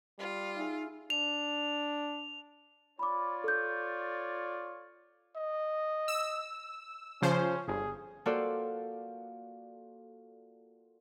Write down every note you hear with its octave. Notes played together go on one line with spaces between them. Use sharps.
G3 F4
D#4 G#4 E5 F5
D4 F7
F4 C#5 D5 B5 D6
A4 G6
D#5
E6
C#3 F3 C#4 C5
G1 G#4
A#3 F4 F#4 A4 C5 D5